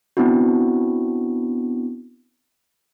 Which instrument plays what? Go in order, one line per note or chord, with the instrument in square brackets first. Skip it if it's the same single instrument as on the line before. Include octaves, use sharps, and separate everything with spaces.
[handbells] B3 C4 D4 E4 F#4